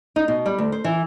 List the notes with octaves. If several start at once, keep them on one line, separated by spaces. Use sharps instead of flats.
D#4
B2
G3
D2
C5
E3